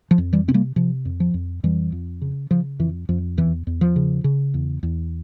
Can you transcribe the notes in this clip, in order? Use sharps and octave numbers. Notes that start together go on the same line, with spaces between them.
F3
F2
E3 G3
C3 C4
G3 A#3
C3 F3
F2
F3
F2
F2 E3 G3
F2
C#3
C#3 F3
F2 E3
F2 F3
E2 E3
E2
F3
C#3
C#3
E2
E2